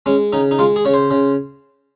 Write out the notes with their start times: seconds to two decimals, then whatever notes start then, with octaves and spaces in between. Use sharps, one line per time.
0.06 G#3 C#4
0.33 C#3 D#4
0.51 D#4
0.59 G#3 F4
0.76 G#4
0.85 C#3 C#5
0.94 C5
1.11 C#3